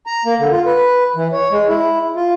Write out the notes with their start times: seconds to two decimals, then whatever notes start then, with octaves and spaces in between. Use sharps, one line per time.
0.06 A#5
0.25 A#3
0.39 D3
0.52 F4
0.66 B4
1.16 E3
1.32 C#5
1.51 G#3
1.69 E4
2.16 F4